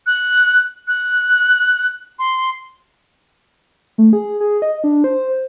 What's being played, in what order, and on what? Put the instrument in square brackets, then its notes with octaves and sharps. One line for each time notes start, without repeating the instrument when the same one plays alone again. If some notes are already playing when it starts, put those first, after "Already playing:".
[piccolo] F#6
F#6
C6
[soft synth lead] A3
G#4
G#4
D#5
D4
C5